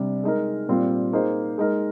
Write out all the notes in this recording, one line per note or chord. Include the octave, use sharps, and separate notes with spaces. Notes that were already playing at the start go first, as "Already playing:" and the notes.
Already playing: C3 G3 D4
G#3 D#4 A#4
A#2 G3 C4 F4
A#3 D#4 G#4 C5
G#3 D#4 A#4